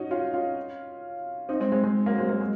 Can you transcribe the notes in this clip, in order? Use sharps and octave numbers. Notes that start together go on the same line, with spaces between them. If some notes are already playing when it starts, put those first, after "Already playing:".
Already playing: C#4 D#4 F#4
C#4 F4
C#4 F4
C4 D#4
G#3 C4
G#3 C4
G#3 C4
F#3 A#3
G#3 C4
F#3 A#3
G#3